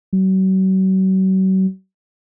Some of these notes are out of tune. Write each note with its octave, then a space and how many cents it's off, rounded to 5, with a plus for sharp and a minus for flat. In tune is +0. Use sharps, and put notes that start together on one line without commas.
F#3 +40